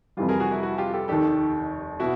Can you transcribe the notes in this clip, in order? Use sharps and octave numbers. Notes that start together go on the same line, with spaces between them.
F2 C3 E3 G3 F4
G#4 A#4
F#4 G#4
E4 F#4
E4 F#4
F4 G4
G4 A4
F1 D#2 D#3 G4 A4
B2 E4 F#4